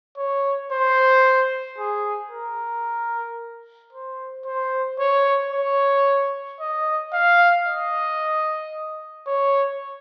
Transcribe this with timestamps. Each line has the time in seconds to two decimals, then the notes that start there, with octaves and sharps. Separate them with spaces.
0.17 C#5
0.72 C5
1.78 G#4
2.31 A#4
3.92 C5
4.46 C5
4.99 C#5
5.53 C#5
6.60 D#5
7.13 F5
7.67 D#5
9.27 C#5